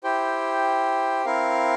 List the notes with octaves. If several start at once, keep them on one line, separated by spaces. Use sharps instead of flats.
E4 G4 C5 G5
C4 E4 A#4 F5